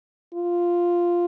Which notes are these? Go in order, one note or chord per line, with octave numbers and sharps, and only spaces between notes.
F4